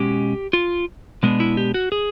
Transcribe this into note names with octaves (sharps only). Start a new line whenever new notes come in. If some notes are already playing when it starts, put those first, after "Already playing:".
Already playing: B2 G#3 C#4 G4
F4
B2 G#3 B3 D4
E4
G4
F#4
G#4